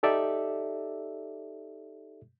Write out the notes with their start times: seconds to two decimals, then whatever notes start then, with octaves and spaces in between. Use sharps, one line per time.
0.03 D#4 G4 A4 D5 E5